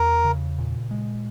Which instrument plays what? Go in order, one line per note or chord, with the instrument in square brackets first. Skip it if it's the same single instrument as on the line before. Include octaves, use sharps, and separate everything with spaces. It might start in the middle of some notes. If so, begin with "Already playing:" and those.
Already playing: [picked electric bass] E2 [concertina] A#4
[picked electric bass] C#3
A#2
G#3